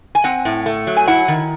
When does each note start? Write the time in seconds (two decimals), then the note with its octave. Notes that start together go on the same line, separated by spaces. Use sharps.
0.15 G#5
0.24 C4 F#5
0.45 A2
0.66 A3
0.87 F#3
0.97 G#5
1.07 E4 F#5
1.28 D#3